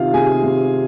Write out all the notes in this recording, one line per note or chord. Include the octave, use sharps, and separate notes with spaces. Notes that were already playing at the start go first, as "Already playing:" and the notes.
Already playing: C3 D#3 F4 F5
C3 G#4 G#5
C3